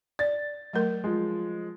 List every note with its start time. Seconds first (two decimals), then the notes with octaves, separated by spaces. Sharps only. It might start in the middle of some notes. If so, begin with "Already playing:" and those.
0.19 D5 A6
0.73 F#3 A3 A#4
1.04 F3 G#3